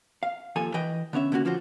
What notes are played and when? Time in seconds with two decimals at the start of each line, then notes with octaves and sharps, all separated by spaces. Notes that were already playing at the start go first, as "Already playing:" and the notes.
0.23 F5
0.56 D#2 F3 A4 G#5
0.74 E3 B4 D#5 G5
1.13 D3 B3 C#4 E5
1.32 D3 A#3 C#4 F#4
1.45 D3 F3 F4 F#4 C5